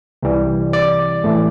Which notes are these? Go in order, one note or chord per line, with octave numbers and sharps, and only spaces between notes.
C2 C3 E3 G3
D5
A2 E3 A3